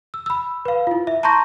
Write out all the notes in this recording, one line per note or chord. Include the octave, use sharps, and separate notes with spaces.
E6
B5 E6
B4 F5
E4 F4
E5
A5 A#5 C6 C#6 G6 A#6